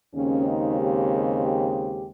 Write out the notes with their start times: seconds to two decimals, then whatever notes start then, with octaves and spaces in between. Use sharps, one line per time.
0.13 D#2 C#3 G#3 C4 C#4
0.45 D#4
0.77 G4
1.40 G4